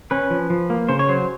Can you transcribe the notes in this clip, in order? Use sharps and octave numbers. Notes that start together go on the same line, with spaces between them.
C#4 B4
F3
F3
A#3
C#3 C5
C#5
F#3 C5